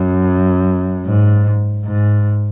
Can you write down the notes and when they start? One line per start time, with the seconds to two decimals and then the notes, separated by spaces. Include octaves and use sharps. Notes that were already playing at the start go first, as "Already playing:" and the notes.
Already playing: F#2
1.06 G#2
1.85 G#2